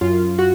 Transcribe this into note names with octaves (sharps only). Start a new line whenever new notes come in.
F#2 F4
F#4